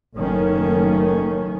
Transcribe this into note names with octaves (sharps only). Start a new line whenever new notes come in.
F#1 D#3 A3 C#4